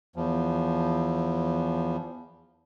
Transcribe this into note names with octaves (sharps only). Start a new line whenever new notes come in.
E2 F3